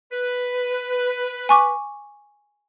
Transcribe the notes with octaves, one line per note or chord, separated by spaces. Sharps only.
B4
G#5 C#6 D6